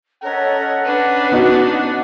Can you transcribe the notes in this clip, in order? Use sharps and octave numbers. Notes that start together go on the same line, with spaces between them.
C#4 A4 A#4 D#5 F#5
C#4 D4 B4
B3 D#4 F#4